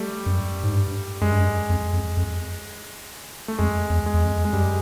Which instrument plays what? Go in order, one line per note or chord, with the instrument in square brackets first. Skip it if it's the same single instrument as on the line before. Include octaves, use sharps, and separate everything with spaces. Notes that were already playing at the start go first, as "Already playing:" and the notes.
Already playing: [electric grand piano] G3 A3
[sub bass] F#2
G#2
G2
[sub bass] F#2 [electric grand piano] G#3
[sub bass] G2
F#2
F2
F2
F2
[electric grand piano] A3
[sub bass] F2 [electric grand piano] G#3
[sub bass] E2
[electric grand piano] G#3
[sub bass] E2
F2
[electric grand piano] G#3
[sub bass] F#2 [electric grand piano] G3